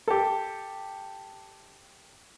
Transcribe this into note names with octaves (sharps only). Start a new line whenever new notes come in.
G4 A4